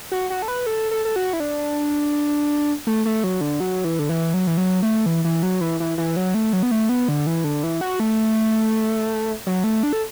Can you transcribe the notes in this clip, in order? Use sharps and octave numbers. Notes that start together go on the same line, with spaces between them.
F#4
F#4
A4
B4
A4
A4
A4
F#4
E4
D4
A3
A3
F#3
D3
F#3
E3
D3
E3
F#3
E3
F#3
A3
E3
E3
F#3
E3
E3
E3
F#3
A3
F#3
B3
A3
B3
D3
E3
D3
E3
F#4
A3
F#3
A3
D4
A4